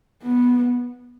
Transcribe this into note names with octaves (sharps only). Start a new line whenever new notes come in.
B3